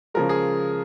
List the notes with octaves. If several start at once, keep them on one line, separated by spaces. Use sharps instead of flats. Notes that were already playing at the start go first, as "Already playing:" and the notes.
C#3 F3 G#3 A#4
G#4